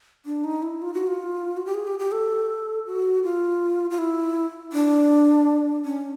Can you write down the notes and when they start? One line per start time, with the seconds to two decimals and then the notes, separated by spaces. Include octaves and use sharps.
0.26 D4
0.44 D#4
0.62 E4
0.82 F4
0.94 F#4
1.07 F4
1.57 F#4
1.66 G4
1.74 G#4
1.87 G4
1.99 G4
2.12 A4
2.86 F#4
3.24 F4
3.91 F4
3.98 E4
4.73 D4
5.85 C#4